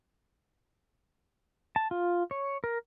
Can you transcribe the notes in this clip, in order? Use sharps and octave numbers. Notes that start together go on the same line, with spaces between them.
A5
F4
C#5
A#4